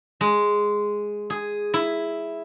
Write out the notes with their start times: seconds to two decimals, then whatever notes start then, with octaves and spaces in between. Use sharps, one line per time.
0.21 G#3
1.30 G#4
1.74 E4